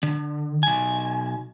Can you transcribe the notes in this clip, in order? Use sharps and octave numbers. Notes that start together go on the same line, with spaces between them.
D3
B1 G#5